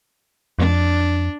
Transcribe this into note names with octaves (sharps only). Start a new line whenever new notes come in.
F2 D4